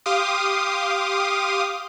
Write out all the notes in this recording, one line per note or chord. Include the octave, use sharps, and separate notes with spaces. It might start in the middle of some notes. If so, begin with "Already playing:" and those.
G4 F5 C6 D6 D#6